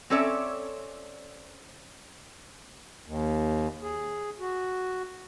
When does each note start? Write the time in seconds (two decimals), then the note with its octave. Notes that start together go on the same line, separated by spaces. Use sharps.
0.10 C4 C#4 A4 C#5 D5 E5
3.06 D#2
3.82 G#4
4.40 F#4